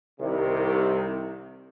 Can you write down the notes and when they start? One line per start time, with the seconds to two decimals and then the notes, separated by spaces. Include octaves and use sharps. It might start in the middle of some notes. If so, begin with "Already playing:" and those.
0.20 C2 C3 D#3